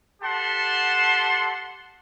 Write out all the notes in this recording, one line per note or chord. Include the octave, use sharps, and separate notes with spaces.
G4 A4 F#5 A5 C6